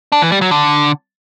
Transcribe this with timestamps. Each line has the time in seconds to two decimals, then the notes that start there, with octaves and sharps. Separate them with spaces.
0.12 D4
0.22 E3
0.32 G3
0.41 F#3
0.51 D3